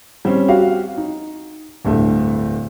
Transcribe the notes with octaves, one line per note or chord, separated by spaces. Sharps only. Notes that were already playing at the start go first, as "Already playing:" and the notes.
G3 C4 C#4
F#4 G4 F5
D#4
D1 G2 A3